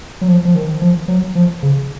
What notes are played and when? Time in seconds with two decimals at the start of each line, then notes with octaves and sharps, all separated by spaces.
0.21 F#3
0.28 F3
0.45 F3
0.55 D#3
0.82 F3
1.08 F#3
1.35 F3
1.63 C#3